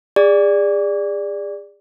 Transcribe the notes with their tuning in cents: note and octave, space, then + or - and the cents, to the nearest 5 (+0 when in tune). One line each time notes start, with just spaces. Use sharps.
G#4 -30 D5 +0